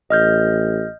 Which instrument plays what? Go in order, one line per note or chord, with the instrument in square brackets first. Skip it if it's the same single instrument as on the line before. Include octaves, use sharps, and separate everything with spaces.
[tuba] A1 [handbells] D#5 F6 G6